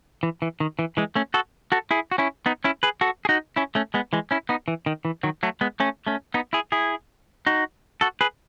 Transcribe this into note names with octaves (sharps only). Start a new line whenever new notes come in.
E3
E3
D#3
E3
E3 G#3
A3 C#4
F#4 A4
F#4 A4
E4 G#4
F#4
C#4 E4
B3 D#4
C#4 E4
G#4 B4
F#4 A4
G#4
D#4 F#4
C#4 E4
A3 C#4
G#3 B3
E3 G#3
C#4 E4
B3 D#4
E3
D#3
E3
D#3 F#3
F#3 A3
G#3 B3
A3 C#4
A3 C#4
B3 D#4
E4 G#4
E4 G#4
D#4 F#4
F#4 A4
G#4 B4